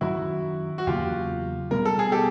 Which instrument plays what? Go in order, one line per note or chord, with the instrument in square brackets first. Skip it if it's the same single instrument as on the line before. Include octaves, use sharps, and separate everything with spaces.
[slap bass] F#2 D#3 F#3 [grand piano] E4 F#4
[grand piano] F#4
[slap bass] E2 C#3 F#3 A#3 [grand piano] F4 G4
[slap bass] B2 G3 B3 [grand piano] A#4
[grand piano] A4
G#4
G4 A4